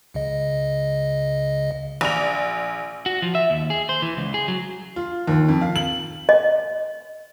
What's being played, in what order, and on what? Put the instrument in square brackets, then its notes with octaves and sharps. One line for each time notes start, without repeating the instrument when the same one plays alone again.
[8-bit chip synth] C#2 C#3 D#5
[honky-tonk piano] A#1 F7
[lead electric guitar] F#4
F3
E5
D#2
G#4
C5
E3
C#2
G#4
F#3
[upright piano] F4
D#2
F2
F5
F#7
[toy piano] D#5